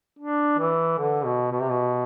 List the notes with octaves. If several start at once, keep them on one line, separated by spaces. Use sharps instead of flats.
D4
E3
D3
B2
B2
C3
B2